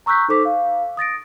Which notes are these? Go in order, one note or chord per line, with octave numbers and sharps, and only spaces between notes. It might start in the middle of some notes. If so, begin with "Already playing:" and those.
A#5 C#6 E6 F#6 G6 B6
D#4 A4 C5 D6 B6
F5
D#6 A6 A#6 D7